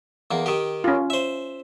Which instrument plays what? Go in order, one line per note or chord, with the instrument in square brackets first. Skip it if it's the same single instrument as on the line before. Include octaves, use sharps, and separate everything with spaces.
[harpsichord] E2 A#3
D#3 G4
[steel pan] C#4 F4
[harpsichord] C5 E5